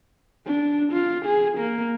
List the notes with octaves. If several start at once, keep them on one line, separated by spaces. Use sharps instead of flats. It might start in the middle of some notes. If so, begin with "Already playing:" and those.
D4
F4
G#4
A#3